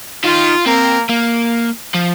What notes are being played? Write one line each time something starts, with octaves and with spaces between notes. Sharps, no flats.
D#3 F4
A#3 C4 A#4
A#3
F3